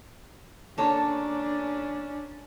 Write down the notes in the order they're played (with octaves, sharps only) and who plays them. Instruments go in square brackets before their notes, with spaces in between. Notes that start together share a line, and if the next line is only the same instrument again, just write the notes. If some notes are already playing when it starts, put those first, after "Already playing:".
[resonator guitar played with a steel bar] A#3 A4 C#5 [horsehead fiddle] C#4 D4